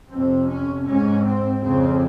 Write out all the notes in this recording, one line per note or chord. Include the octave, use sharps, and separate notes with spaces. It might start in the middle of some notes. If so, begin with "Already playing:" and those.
F2 C3 C4
C#4
G#2 C#4
C4
F2 C#3 C4